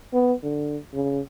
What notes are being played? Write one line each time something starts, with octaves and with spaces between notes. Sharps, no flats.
B3
D3
C#3